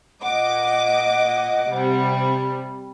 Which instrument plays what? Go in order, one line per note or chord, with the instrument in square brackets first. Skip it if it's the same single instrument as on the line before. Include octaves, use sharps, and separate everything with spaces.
[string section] A#2 D#5 D6 [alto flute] F#5
[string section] C3 G3